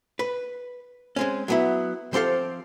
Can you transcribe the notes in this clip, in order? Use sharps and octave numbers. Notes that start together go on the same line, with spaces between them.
B4
G#3 C4 C#4
F#3 B3 E4
F3 C4 G4 A4 F5